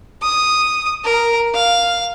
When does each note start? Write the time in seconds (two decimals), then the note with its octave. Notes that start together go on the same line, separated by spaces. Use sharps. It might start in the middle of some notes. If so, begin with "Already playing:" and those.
0.22 D#6
1.04 A#4
1.54 F5